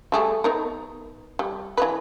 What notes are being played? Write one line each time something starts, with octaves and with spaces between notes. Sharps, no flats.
G3 A3 G#4
B3 D#4 A#4
G3
E3 G#3 B4